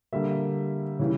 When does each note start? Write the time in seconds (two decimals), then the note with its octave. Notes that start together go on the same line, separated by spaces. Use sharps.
0.13 D3 G3 A#3 E5
0.99 C#3 E3 G3